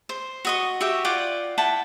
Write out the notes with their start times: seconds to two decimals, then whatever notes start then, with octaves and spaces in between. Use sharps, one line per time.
0.09 C5
0.45 F#4 D#5 C#6
0.81 F#4 G4 E5 G5
1.04 F4 D5 F#5 G5
1.58 E4 F#5 G5 A5